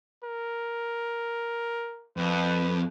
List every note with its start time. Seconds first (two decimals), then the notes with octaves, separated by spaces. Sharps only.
0.24 A#4
2.17 F2 B4